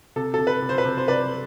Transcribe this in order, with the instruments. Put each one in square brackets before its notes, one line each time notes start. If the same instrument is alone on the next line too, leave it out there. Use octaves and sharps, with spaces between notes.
[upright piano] C3 A4
C3 A4
B4
C3
C5
B4
C3
C5
C3 B4 D5